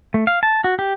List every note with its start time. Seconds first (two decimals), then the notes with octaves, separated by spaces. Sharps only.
0.14 A3
0.27 F5
0.43 A5
0.64 F#4
0.79 G4